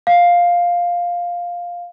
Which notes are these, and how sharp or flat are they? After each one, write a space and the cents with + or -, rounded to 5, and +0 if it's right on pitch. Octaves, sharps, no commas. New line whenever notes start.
F5 +5